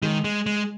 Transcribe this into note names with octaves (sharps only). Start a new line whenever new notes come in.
D#3 G#3
G#3
G#3